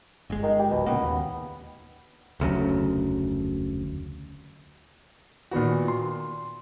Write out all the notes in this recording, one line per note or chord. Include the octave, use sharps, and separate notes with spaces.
G1 G#3
D#3
G4
D1 B2
A#2 C#3 A#3 B3
D#2
F1 D2 C#3 F#3
A#2 D#3 B3 F#4
C6